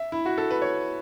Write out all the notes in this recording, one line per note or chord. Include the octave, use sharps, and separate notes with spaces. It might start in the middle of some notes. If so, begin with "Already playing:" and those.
Already playing: E5
E4
F#4
A4
B4
C#5